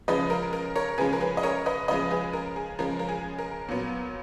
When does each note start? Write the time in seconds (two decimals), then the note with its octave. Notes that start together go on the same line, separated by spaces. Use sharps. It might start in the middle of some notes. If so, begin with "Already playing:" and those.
0.08 C#3 F3 G#3 B4 D#5
0.30 A#4
0.53 A#4
0.76 A#4 C#5
0.98 C#3 F3 G#3 G#4 B4
1.13 A#4
1.20 G#4 B4
1.37 D#5
1.43 A#4 C#5
1.66 B4 D#5
1.88 C#3 F3 G#3 B4 D#5
2.11 G#4 B4
2.33 A#4
2.56 G#4
2.78 C#3 F3 G#3 A#4
2.99 A#4
3.09 G#4
3.39 A#4
3.69 A#2 F#3 B3